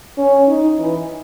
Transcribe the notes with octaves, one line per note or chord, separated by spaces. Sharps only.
C#4
D#4
E3